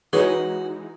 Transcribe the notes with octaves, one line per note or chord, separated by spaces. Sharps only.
E3 G#3 D#4 F#4 G#4 B4 C#5